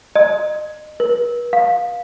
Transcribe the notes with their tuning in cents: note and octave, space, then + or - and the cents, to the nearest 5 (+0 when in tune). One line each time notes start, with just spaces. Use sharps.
D#5 -30
B4 -45
F5 +20